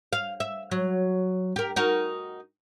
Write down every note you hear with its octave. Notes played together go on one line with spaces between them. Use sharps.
F5
E5
F#3
G4 A#4
D#4 F#4 A#4